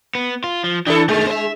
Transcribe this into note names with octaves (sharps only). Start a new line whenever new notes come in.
B3
F4
F3
E3 D4 E4 A4
D#3 G#3 A3
C5 E5